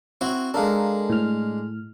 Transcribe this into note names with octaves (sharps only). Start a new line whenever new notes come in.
C4 E4 F#4
G#3 D4 A4 A#4 F5
A2 F6